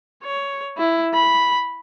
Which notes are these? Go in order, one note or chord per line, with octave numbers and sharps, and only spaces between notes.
C#5
E4
B5